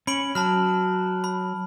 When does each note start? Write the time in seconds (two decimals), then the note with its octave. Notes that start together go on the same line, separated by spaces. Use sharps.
0.07 C#4 B5 D7 F#7
0.35 F#3 A5 B5 F6
1.24 B5